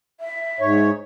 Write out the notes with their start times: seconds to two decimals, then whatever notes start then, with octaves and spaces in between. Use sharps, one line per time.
0.20 E5
0.60 G#2 C#5